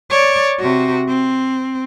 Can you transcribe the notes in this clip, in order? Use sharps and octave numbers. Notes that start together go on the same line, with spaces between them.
C#5 D5
C3 F#4
C4